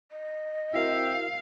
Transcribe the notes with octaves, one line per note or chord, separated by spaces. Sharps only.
D#5
C4 E4 F#4 A#4 E5 F5 G5